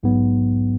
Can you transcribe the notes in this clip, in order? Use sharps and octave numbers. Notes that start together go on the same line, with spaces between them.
A#1 G#2 F#3 B3